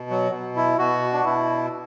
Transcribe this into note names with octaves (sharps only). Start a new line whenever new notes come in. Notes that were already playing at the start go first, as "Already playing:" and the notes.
Already playing: B2
F#3
B2
E4
B2 F#4
D4
B2 E4